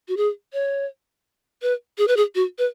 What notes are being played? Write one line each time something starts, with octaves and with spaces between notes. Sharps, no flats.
F#4
G#4
C#5
B4
G#4
B4
G#4
F#4
B4